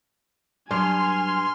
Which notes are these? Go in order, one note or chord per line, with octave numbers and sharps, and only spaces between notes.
G2 F#3 G#5 C6 F6